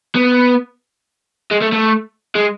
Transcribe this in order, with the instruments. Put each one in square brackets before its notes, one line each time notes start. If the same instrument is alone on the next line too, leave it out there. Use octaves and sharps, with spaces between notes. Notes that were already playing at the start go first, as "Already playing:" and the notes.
[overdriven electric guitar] B3
G#3
A3
A3
G#3